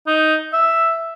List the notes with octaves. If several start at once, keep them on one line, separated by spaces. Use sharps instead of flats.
D#4
E5